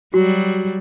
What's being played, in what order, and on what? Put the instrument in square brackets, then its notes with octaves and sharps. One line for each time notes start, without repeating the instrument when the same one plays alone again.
[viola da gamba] F#3 G3 [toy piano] F#4